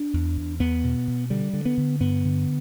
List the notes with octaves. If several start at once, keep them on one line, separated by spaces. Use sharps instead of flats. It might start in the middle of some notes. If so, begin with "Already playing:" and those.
Already playing: D4
E2
E2
E2 B3
B2
B2
D3 G3
D3
B3
D3
G2 B3
D3